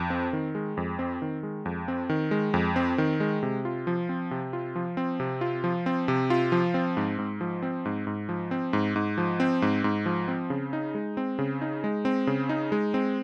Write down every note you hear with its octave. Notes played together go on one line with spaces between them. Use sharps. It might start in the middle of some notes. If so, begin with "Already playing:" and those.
Already playing: F2
C4
D#3
G#3
F2
C4
D#3
G#3
F2
C4
D#3
G#3
F2
C4
D#3
G#3
C3
F4
F3
C4
C3
F4
F3
C4
C3
F4
F3
C4
C3
F4
F3
C4
G#2
G#2
F3
C4
G#2
G#2
F3
C4
G#2
G#2
F3
C4
G#2
G#2
F3
C4
C#3
D#4
G#3
C4
C#3
D#4
G#3
C4
C#3
D#4
G#3
C4